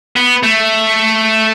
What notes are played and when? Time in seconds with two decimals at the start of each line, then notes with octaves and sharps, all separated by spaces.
0.16 B3
0.43 A3